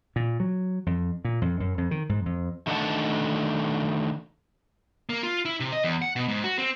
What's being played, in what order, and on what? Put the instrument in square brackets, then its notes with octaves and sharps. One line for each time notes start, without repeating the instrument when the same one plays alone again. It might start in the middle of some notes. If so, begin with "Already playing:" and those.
[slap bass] A#2
F#3
F2
A#2
F2
F#2
F2
D#3
G#2
F2
[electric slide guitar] D#3 A3 D4 D#5 F#5 A5
[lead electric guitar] A#3
F4
E4
C3
D#5
E2
F#5
B2
G#2
F#4
C4